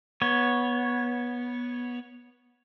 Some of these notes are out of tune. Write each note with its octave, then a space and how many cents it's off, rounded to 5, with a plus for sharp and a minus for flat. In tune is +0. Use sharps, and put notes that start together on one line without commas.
B3 -15 C#5 +0